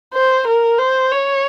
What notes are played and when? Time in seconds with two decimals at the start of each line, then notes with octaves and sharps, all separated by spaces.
0.14 C5
0.47 A#4
0.78 C5
1.11 C#5